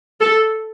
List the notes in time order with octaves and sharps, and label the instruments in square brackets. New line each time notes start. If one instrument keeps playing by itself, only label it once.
[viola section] A4